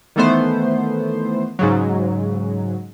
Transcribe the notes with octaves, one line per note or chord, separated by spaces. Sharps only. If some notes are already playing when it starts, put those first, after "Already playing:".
D#3 E3 A3 B3 C5
G#2 C#3 F#3